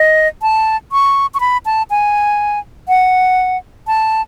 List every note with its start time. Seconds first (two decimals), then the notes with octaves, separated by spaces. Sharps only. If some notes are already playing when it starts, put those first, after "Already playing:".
Already playing: D#5
0.42 A5
0.92 C#6
1.34 C#6
1.40 B5
1.66 A5
1.90 G#5
2.88 F#5
3.87 A5